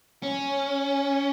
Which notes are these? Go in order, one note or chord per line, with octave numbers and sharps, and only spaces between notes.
C#4